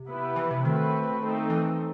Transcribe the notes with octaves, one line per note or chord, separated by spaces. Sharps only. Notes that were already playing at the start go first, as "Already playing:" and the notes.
Already playing: C3
B3 E4 G4 B4
E3
C3
D#3 A3 C4 F#4 B4
A3 C4 D#4 A4
E3